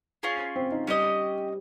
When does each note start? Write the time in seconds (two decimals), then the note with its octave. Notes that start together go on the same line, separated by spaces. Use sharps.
0.23 C#4 F4 G#4
0.56 C4
0.72 D#4
0.87 G3 C#4 G4 C5 D#5